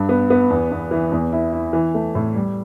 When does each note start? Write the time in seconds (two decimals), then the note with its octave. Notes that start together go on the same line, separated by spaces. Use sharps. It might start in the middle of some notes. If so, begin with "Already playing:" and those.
Already playing: G2
0.09 B3
0.30 B3
0.50 E2
0.71 E2
0.91 E3
1.12 E2
1.33 E4
1.53 E4
1.73 E3
1.94 A3
2.15 A2
2.35 G3